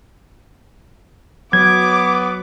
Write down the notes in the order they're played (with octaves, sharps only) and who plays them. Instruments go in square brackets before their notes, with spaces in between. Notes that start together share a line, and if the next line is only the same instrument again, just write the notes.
[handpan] F#3 [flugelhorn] B3 [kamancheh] D6 [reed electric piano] G#6